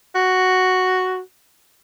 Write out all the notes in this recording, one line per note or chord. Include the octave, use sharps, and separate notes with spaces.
F#4